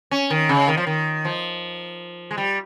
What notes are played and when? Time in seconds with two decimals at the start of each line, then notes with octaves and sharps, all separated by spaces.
0.11 C#4
0.30 D#3
0.49 C#3
0.68 D#3
0.77 F3
0.87 D#3
1.25 F3
2.31 G#3
2.38 G3